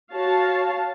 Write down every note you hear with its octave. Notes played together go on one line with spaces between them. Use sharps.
F#4 C#5 F5 A5